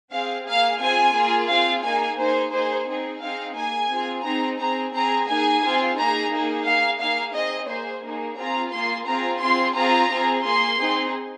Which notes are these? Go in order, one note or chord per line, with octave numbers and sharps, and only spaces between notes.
C4 G#4 F5
A#3 G#4 F5
C4 F4 G#4 G#5
A#3 F4 G#4
C4 F4 G#4 F5
A#3 D#4 G#4 G#5
A#3 D#4 G#4 C5
A#3 D#4 G#4 C5
C4 D#4 G#4
C4 D#4 G#4 F5
A#3 G#4 G#5
C4 F4 G#4
C4 D#4 G#4 A#5
C4 G#4 A#5
C4 G#4 A#5
A#3 D#4 G#4 G#5
C4 F4 G#4
A#3 D#4 G#4 A#5
A#3 D#4 G#4
A#3 G#4 F5
A#3 D#4 G#4 F5
C4 G#4 D#5
A#3 G#4 C5
A#3 D#4 G#4
C4 F4 G#4 A#5
A#3 F4 G#4 C6
C4 F4 G#4 A#5
C4 F4 G#4 C6
C4 F4 G#4 A#5
C4 F4 G#4
A#3 G#4 C6
C4 D#4 G#4